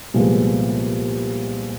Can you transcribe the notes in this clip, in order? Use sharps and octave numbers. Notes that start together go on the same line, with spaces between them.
C2 A#2 F3 G#3 B3